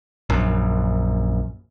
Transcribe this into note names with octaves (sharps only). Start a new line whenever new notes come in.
A#1 F#2